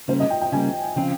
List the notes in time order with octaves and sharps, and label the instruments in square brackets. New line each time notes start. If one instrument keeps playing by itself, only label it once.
[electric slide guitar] C#3 G3 A#3 [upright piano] C5
[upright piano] D#5
G5
G5
[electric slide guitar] C#3 G3 A#3 [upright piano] G#5
[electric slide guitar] C#3 F3 C4 F4 [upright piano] G5